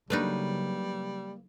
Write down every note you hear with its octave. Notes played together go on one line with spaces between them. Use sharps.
C#3 F#3 G3 A3 A#3 D4 D#4 B4